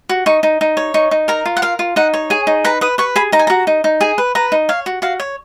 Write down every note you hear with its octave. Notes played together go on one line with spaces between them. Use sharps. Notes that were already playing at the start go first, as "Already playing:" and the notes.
F#4
D#4 C#6
D#4
D#4
C#5
D#4 C#6
D#4
A#4 A#5
F4
F#5
A#4 F5
F4
D#4 F#5
C#5
G#4 G#5
D#4
B4 A#5
B4 D#6
B4 C#6
G#4 B5
D#4 A#5
G#5
F#4 A#5
D#4
D#4
G#4 G#5
B4
B4 A#5
D#4
C#5 F5
F#4
F#4 F5
C#5